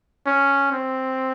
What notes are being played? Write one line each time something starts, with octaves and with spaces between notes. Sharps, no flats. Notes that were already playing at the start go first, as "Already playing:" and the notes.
C#4
C4